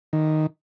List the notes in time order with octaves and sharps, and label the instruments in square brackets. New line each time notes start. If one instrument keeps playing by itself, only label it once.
[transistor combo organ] D#3